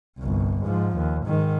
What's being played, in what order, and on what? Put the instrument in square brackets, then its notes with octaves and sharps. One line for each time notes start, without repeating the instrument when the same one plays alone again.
[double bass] G1 C2
G#2 F3
D#2
G#2 D#3